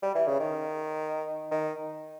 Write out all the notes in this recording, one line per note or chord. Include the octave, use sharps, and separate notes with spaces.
G3
E3
C#3
D#3
D#3